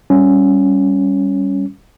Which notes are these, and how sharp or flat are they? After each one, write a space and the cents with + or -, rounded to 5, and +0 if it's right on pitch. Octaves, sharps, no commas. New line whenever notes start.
G3 +0 C#4 +0